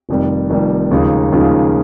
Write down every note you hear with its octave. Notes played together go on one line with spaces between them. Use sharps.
F1 F2 D#3 G3
F1 F2 D#3 G3
D#2 C#3 F3 G#3 D#4
D#2 C#3 F3 G#3 D#4